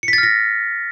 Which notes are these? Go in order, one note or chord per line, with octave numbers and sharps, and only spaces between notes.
C#7
B6
A6
F6
A#6